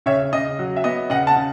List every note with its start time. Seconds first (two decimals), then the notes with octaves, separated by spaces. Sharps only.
0.06 C#3 C#5 E5
0.33 C#3 D#5
0.59 F#3
0.76 E5
0.84 B3 D#5
1.10 C#3 D#5 F#5
1.27 F#5 A5
1.36 C#3